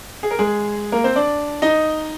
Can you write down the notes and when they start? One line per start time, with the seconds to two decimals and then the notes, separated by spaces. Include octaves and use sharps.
0.23 G#4
0.31 A#4
0.39 G#3 G#4
0.92 A#3 A#4
1.04 C4 C5
1.16 D4 D5
1.62 D#4 D#5